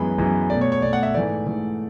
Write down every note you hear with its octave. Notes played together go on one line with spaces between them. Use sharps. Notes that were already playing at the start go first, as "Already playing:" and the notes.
Already playing: F#2 E3 G#3 B3 B5
F#2 E3 G#3 B3
A3 D5
B2
C#5
C#5
B2 A3 D5
F#5
E5
G#2 E3 A3 D5
G#2 E3 A3